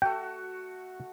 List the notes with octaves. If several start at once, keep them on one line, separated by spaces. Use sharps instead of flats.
A3 F#4 G5